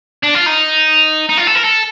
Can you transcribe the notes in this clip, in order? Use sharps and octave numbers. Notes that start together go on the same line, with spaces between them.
D4
F4
D#4
D#4
F4
A4
A#4
A4